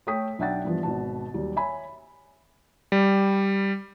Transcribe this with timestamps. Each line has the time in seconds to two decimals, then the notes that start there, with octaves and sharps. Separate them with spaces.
0.07 A3 A4 C#5 G5 D#6 B6
0.39 B1 D4 E5 F#5 G5 A6
0.65 G2 E3 F3 B3 F4
0.83 G#1 B2 A5
1.34 D#2 F#3 G3
1.56 C#5 E5 G#5 B5
2.92 G3